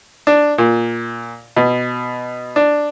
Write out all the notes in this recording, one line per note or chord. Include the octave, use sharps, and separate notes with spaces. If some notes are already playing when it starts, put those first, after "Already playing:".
D4
A#2
B2
D4